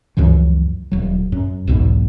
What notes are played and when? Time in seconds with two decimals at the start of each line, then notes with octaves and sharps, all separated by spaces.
0.17 C#2 F#2 E3 F3
0.92 D#1 F#3
1.32 F#2
1.67 B1 E2 G#2 B2